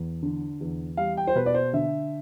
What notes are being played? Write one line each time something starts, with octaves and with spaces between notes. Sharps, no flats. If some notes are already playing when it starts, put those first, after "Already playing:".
Already playing: E2
D3
E2
G3 F5
G5
C5
B2 B4
D5
C5
D3 E5